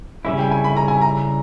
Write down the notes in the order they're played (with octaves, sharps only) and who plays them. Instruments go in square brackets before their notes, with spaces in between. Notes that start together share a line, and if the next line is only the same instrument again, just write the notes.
[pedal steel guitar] C#3 G3 C#4 E4 [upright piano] E5
[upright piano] G5
G#5
B5
A#5
G#5
A#5